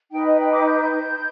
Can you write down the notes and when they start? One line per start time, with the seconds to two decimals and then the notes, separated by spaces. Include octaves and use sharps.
0.10 D#4 B4 G5
0.24 D#5
0.39 G5
0.52 D6
0.66 G6